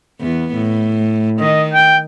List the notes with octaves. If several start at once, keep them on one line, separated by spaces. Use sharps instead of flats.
E2 B3
A2
D#3 D#5
G5